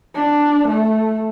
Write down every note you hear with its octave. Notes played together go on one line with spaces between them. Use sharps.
D4
A3